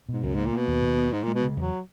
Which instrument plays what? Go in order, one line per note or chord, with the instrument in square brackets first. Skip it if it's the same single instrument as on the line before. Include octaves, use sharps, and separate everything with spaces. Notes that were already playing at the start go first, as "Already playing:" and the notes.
[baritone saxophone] G#2 [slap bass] B2
[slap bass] C#2 [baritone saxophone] F#2
[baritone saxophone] G#2 [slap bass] A#3
[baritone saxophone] A#2
[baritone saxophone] B2 [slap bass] A#3
[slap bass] D#2
D#2
B3
[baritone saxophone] G#2 [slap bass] G#3
[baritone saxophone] A#2 [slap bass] G#3
[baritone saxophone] B2
[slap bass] C#3
[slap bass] E2 [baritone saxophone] F#3